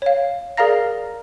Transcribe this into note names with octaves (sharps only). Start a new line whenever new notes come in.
C#5 F5
G#4 A#4 D5 F5 A#5 A#6